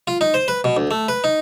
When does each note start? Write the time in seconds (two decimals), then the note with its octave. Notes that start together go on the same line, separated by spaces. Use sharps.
0.07 F4
0.21 D#4
0.34 C5
0.48 B4
0.64 B2
0.77 D2
0.91 A3
1.08 B4
1.24 D#4